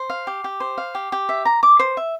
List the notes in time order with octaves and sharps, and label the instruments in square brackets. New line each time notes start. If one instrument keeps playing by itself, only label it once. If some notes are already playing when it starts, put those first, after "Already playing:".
Already playing: [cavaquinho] C5
F5
G4
G4
C5
F5
G4
G4
E5
A#5
D6
C5
E5